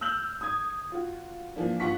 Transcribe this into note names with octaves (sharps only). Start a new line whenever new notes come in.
E6 F6 G6 F#7
D#6 G#6
F4 F#4
E3 F3 A#3 D4
G2 F4 F#5 C#6 B6